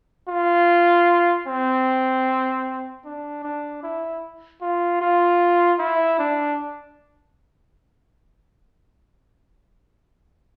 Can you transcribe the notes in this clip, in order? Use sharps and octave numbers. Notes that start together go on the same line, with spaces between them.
F4
C4
D4
D4
E4
F4
F4
E4
D4